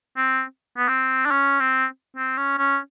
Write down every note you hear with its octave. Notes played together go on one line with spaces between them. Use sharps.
C4
B3
C4
D4
C#4
C4
C4
C#4
C#4